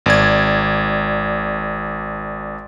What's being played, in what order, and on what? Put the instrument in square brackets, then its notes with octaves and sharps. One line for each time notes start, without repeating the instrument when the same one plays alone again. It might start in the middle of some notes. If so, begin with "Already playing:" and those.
[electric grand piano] G#1 D5 G#6